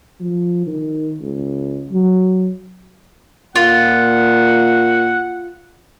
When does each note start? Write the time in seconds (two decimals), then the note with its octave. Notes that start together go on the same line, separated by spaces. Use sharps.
0.20 F3
0.67 D#3
1.21 C#2
1.90 F#3
3.56 A#2 F4 F#5